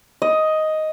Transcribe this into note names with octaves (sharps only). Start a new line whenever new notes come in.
D#5